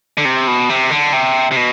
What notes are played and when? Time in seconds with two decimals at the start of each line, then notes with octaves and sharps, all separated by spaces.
0.17 D3
0.25 C3
0.47 B2
0.69 C3
0.91 D3
1.13 C3
1.51 C3
1.57 B2